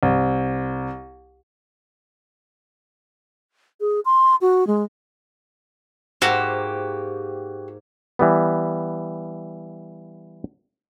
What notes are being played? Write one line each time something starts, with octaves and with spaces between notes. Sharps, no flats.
C2
G#4
C6
F#4
G#3
G#2 A#3 F#4 G4 C5
E3 G3 B3